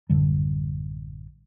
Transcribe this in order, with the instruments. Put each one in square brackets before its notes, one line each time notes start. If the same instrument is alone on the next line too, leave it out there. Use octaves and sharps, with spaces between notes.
[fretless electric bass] A1 F#2 D3 G3